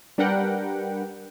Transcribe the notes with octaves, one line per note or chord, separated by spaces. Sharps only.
G3 D4 A#4 B4 F#5 G5